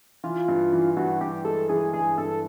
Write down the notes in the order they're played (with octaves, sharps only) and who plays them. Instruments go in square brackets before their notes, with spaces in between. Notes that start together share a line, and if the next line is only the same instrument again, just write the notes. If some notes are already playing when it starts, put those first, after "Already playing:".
[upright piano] E3 [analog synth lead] F4
[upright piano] G2
E3
[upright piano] G2 [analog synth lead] F#4
[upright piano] G2 [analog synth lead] G4
[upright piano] G#3 [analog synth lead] A4
[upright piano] E3 [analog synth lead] G#4
[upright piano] G2 [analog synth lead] G#4
[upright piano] G2 [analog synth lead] A4